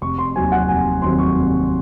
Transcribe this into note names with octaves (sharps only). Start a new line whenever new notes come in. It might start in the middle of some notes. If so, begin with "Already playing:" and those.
F1 C#6
C6
D#2 D#3 F#3 C4 G#5
F#5
F1 G#5
D#2 D#3 F#3 C4 C6
C#6
F1